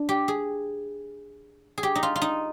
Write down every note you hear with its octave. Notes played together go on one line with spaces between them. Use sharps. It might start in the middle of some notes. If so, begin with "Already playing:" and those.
Already playing: D4
G4
G#4
G#4
G4
D#4
F4
F4
D#4